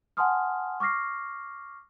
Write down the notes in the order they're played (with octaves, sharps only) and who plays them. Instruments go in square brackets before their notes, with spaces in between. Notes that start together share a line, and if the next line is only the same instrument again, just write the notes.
[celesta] F#5 G#5 A5 C6 D#6 F6
C#6 D6 F6 A#6 C7